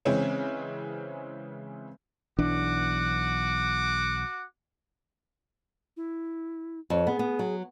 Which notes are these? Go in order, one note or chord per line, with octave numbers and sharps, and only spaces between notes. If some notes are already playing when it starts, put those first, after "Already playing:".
C#3 E3 G#3 C4 C#4
B1 E3 D4 F#4 F#5 D6
E4
F2 C#5
B3 G#4
B3
F#3